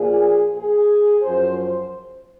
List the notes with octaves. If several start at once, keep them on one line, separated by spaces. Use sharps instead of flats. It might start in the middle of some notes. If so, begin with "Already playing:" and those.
Already playing: A#2 F3 G#4
G#4
F#2 F3 C5
C5